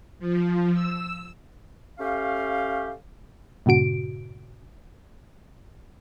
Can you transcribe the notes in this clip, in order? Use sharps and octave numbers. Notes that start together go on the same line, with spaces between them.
F3
E6
A3 C#4 G4 F5
G2 A#2 C#3 F#4 D7